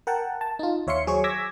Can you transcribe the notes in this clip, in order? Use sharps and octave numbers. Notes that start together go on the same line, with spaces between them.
A#4 F#5 G5 A5
A5
D#4 F4
D#2 C#5 E5 F5 C6 C#7
F#3 G#4 C5 C#5 C#6
D6 E6 G#6 A#6 B6